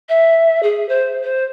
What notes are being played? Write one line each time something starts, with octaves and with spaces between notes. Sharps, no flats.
E5
G#4
C5
C5